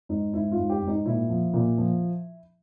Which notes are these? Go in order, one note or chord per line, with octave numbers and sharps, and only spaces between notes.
G#2 D#4
G#2 E4
F4
G#2
G4
G#2
D#4
A#2 E4
F3
A#2
F3